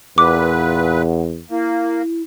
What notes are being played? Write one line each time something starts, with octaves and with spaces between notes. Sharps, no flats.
E2 A#2 B4 F#5 D6
A#3 E4